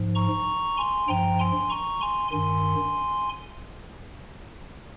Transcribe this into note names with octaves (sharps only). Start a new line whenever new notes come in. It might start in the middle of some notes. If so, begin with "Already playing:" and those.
Already playing: G#2 F3
A#5 C#6
G#5 C6
G2 F3 G5 A#5
G#5 C6
A#5 C#6
G#5 C6
G2 D#3 G#5 C6